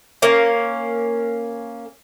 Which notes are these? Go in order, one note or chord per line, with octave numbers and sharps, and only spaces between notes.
A#3 C#4